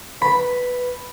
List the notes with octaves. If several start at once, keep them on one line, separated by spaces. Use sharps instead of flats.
B4 B5